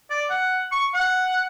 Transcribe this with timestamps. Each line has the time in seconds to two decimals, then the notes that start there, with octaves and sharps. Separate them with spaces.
0.10 D5
0.30 F#5
0.72 C#6
0.94 F#5